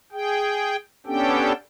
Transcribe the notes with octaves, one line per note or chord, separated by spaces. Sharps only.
G#4 G5
B3 C#4 D4 G4 A4 G5